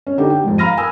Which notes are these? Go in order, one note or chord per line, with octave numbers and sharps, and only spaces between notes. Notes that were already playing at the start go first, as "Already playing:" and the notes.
C#4
D3 D#4 G4
G5
F2 G#2
F5 A#5 B5 F6 A#6 D#7
G#5 D#6 E6